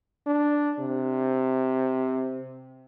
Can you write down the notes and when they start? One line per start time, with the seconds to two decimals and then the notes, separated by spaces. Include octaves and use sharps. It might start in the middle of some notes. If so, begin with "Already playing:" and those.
0.27 D4
0.79 C3